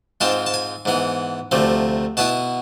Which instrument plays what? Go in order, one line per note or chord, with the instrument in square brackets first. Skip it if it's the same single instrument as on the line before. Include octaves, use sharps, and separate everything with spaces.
[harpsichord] G#2 G#3 C4 F4 A5
A5
G#5
G#2 E3 B3
D2 C3 F3 A3
B2 B3 E4 A5